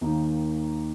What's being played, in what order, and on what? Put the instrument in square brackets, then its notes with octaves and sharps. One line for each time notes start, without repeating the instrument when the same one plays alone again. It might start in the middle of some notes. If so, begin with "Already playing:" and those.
[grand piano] D#2 D#3 A#3 D#4